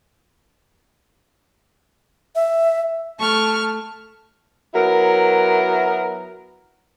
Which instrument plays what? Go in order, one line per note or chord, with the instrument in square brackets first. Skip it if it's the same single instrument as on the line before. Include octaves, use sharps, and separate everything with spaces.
[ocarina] E5
[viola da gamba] A3 [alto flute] A5 [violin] C#6 F6
[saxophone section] F#3 B3 E4 A#4